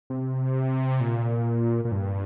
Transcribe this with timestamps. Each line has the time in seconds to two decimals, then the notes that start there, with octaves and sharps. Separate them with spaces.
0.10 C3
1.01 A#2
1.85 A#2
1.92 G2